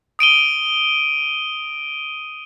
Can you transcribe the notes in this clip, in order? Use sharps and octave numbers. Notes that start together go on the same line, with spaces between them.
D#6 D7 D#7 G7